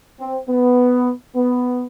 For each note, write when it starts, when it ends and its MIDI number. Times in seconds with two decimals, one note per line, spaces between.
0.20 0.39 60
0.49 1.11 59
1.36 1.84 59